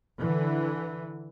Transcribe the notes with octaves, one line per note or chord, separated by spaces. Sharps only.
D3 E3